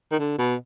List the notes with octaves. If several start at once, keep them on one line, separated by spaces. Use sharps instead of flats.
D#3
D3
B2